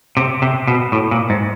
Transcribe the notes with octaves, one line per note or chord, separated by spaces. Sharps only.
C3
C3
B2
A2
A#2
G#2